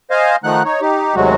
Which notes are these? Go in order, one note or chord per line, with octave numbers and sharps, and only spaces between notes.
C5 D#5 F5 G#5
D#3 F3 A3 D#4 F#5 F#6
D#4 C#5
D#4 G4
D#2 C3 F#3 G#3 A3 F#4